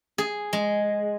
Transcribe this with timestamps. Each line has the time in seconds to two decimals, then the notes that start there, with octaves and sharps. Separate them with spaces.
0.18 G#4
0.53 G#3